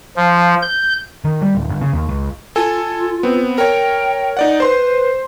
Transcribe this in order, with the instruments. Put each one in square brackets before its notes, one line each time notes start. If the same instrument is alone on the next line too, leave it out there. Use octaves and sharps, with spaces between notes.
[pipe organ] F3
G6
[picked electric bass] D#3
G3
D1
G1
C#3
D#2
C#2
[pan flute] F4 [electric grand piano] A4 G#5
[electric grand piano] B3 C4
[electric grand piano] A#4 C#5 [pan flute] G5
[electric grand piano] D#4 D5 F#5
[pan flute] B4 [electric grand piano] C5 C6